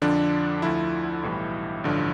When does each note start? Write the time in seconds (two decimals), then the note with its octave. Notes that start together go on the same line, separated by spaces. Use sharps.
0.02 F2 D3 F3 D4
0.62 D2 D3 F3 E4
1.23 B1 A2 E3 G3
1.84 A1 G2 D3 F3